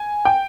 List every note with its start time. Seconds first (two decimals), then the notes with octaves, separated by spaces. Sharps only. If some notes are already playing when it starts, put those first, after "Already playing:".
Already playing: G#5
0.25 G5